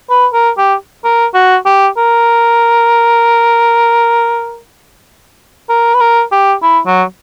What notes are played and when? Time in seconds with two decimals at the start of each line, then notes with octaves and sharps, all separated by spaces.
0.10 B4
0.33 A#4
0.58 G4
1.04 A#4
1.34 F#4
1.66 G4
1.98 A#4
5.69 A#4
5.94 B4
6.00 A#4
6.32 G4
6.63 E4
6.87 F#3